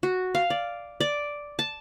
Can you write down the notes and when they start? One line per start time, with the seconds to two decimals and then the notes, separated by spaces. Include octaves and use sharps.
0.03 F#4
0.35 F5
0.50 D5
1.01 D5
1.59 A5